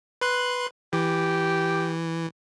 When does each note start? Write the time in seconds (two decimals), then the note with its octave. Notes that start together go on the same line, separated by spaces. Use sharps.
0.21 B4 C6 F#6
0.93 E3 G4